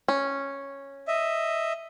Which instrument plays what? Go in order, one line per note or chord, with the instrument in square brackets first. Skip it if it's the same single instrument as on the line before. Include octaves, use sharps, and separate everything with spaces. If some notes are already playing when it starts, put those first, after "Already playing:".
[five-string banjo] C#4
[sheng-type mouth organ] D#5 E5